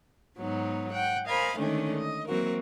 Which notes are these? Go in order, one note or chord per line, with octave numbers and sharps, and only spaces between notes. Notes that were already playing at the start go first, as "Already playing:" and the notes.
G#2 F#3 B3 D#4
F#5 G5
A#4 C5 D#5 F5 G#5 B5
D3 D#3 G#3 A3 C#4 D4
D#5
E3 F#3 A#3 C4 F#4 A#4